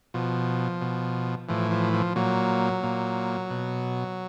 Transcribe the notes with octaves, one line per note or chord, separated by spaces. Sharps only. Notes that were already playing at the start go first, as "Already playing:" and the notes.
B2 F3
B2
A2 E3 F3
F3
F3
A#2 F#3
A#2
B2